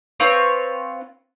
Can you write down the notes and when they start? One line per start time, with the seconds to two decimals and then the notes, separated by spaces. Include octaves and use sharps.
0.20 C4 F4 B4 C#5